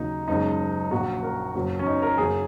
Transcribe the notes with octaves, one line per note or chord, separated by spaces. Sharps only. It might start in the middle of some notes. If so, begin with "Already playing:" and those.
Already playing: D#2 C#3 F#3 A#3 D#4
F#1 F#2 C#3 G#3 D#4
A#1 A#2 A#3 F#4
A#4
F#1 F#2 F#3 A#3
C#4
D#4
A#4
F#1 F#2 F#3 A#3 G#4